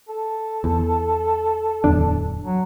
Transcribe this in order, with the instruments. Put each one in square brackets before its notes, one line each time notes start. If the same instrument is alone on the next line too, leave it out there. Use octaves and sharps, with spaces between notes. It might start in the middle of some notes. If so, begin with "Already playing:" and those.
[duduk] A4
[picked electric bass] E2
D1 E2 D4
[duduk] F#3